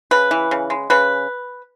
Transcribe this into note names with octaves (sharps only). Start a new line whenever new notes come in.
C#3 B4
E3
C#3
G#3
C#3 B4